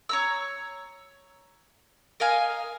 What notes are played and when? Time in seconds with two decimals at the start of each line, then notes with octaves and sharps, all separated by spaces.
0.09 C#5 A#5 E6
2.20 A#4 D#5 F5 G#5